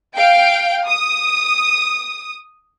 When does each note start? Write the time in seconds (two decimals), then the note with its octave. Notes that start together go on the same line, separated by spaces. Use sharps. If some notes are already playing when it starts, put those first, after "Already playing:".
0.15 F5 G5 D7
0.86 D#6